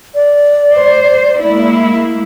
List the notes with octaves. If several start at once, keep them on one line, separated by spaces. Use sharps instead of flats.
D5
C5
G#3 A#3 E4